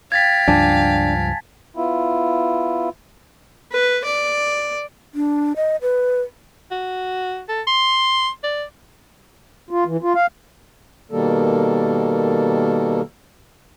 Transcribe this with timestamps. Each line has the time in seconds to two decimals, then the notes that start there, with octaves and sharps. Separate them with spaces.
0.12 F5 G5 G#6 A6 B6
0.48 C#2 G2 F3 D4 G#5 A5
1.76 B3 E4 F4
3.72 B4
4.04 D5
5.15 D4
5.56 D#5
5.82 B4
6.71 F#4
7.48 A4
7.67 C6
8.44 D5
9.71 F4
9.85 E3
10.03 F4
10.15 F5
11.11 B2 D#3 G3 A#3 A4